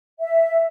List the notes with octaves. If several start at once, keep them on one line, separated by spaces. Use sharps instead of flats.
E5